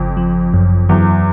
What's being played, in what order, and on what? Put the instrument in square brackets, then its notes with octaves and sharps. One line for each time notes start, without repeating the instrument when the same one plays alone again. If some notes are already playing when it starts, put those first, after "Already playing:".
Already playing: [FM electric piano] G1 C#3 [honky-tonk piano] F2
[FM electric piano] F3
F#2
[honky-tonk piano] E2 [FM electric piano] F#3